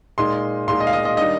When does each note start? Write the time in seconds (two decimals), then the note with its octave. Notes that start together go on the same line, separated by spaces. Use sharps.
0.18 A#2 G#3 D#4 C6
0.68 A#2 G#3 D#4 C6
0.80 D#5
0.87 F5
0.93 D#5
1.05 D#5
1.17 D#3 G3 D4 D#5